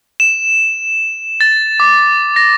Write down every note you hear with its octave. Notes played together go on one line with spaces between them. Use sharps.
E7
A6
D6
A#6